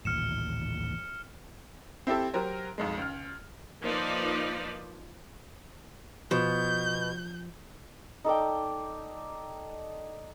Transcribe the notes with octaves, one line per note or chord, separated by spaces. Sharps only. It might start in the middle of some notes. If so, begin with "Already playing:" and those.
A1 D#2 A#2 F6 C#7 E7
C4 E4 G4 A4
F#3 G4 A#4 C5
B1 F2 G#3
C#2 F6
F3 A#3 D#4 B4 C5 D5
B2 F3 G6
D#4 A4 D5 G5